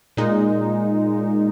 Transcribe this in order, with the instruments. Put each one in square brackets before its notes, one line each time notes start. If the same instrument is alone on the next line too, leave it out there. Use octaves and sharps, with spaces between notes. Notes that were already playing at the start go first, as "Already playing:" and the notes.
[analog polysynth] A#2 G#3 D#4